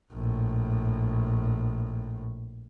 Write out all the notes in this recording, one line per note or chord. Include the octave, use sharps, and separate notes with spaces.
A#1 A2